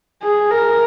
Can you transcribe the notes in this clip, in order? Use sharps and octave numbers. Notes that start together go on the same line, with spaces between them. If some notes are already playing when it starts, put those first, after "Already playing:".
G#4
A#4